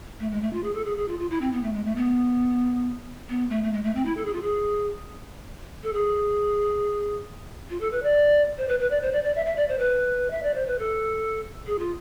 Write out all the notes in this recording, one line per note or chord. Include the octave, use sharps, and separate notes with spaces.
A3
G#3
A3
F4
G#4
A4
G#4
G#4
F4
F4
E4
C4
B3
A3
G#3
A3
B3
B3
A3
A3
G#3
A3
C4
E4
A4
G#4
F4
G#4
A4
G#4
F4
A4
B4
D5
C5
B4
B4
D5
C5
D5
D5
E5
E5
D5
C5
B4
E5
D5
C5
B4
A4
G#4
F4